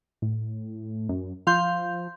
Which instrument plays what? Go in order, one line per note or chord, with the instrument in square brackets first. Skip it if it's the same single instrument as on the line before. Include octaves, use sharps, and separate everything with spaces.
[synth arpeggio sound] A2
F#2
[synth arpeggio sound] F3 [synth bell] F5 C6 G6